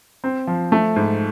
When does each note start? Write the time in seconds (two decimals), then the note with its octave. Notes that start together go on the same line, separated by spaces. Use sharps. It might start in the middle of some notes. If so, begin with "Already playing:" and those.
0.24 C4
0.47 F3
0.72 A3
0.96 G#2